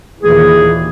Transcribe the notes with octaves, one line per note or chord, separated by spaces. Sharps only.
D#2 A#2 E3 G#4